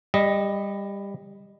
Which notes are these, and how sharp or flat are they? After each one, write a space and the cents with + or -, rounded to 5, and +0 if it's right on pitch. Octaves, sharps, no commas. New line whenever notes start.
G3 +20 D#5 +0